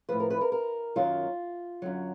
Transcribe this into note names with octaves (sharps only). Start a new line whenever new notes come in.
A2 F3 B4
A#4
B4
A#4
A#4
F#2 D#3 F#3 F4
F#2 D3 F#3